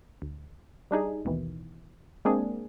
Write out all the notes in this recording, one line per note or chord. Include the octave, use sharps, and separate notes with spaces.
D2
G3 D4 D#4 G#4
A1 D#2 B2 D#3 E3
G#3 A#3 C4 D4 G#4